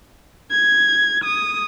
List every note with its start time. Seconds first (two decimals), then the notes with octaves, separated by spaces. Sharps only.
0.51 G#6
1.24 D#6